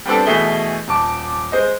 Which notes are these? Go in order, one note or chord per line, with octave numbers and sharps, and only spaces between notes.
G3 B3 C4 D4 A4
B2 E3 A3 G#4 E5 G7
D#1 A5 D6
G#3 C5 D#5